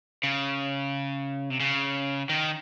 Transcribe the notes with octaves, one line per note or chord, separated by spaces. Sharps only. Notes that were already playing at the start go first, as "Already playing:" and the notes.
C#3
C3
C#3
D#3